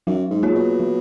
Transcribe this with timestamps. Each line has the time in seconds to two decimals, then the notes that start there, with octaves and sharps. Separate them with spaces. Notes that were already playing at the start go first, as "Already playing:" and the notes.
0.07 F#2 F#3
0.31 G#2
0.43 A#3 F4 G#4 C#5
0.55 B2
0.80 F#3